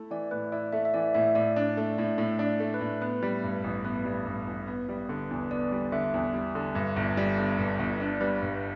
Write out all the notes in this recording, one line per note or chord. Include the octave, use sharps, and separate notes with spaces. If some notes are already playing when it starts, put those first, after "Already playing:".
Already playing: A3 E4
E3 D5
A2 B4
E4 D5
A3 E5
E5
E3 D5
A2 E5
A2 D5
D4
A3
A2
A2 E5
D4
D5
A3
B4
A2
B3 B4
G3
G2
A1
B3 B4
G3
G2
A1
B3
G3
D3
E2
B3 D5
G3
D3 E5
E2
G3
D3
G2
G1
G3
D3
G2
G1
D4 D5
G3 B4
G2